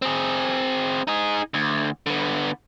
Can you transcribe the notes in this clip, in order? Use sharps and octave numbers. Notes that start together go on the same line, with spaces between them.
C4 G#4
D#4 G#4
D2
D3 B3